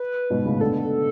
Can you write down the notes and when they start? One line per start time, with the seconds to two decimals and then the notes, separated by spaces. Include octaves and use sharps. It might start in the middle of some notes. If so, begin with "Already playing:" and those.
Already playing: B4
0.30 G#2 B2
0.45 A2 C#3
0.60 B2 D3 A4